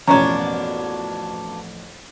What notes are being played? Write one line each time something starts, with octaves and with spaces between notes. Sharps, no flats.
A1 F2 B2 A#3 C#4 D4 C#5 A#5